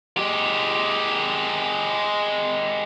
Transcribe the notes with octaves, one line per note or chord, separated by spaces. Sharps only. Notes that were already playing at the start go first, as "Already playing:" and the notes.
G#3 G4